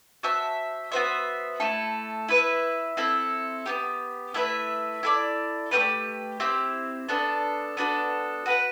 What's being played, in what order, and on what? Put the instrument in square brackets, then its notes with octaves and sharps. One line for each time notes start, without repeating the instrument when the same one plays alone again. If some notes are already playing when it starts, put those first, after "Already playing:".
[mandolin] F#4 C5 E5 A5
B3 F#4 C5 E5
A3 E4 A4
E4 B4 E5
C4 E4 A4
B3 E4 G4
A3 E4 B4 E5
E4 A4 D5
A3 C4 G4 B4
C4 E4 G4 C5
B3 D4 A4
B3 D4 F#4 A4
F#4 B4 F#5